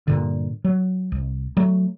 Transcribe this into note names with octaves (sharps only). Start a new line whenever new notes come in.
G2 A#2 D3
F#3
C2
F#3 A3